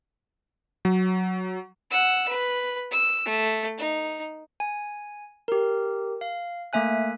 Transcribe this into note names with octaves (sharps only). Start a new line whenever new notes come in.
F#3
F#5 E6
B4
E6
A3
D#4
G#5
G4 A#4
F5
A3 A#3 E5 G#5 F#6